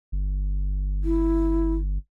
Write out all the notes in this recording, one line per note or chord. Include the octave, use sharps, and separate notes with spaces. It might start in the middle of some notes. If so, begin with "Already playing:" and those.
G1
E4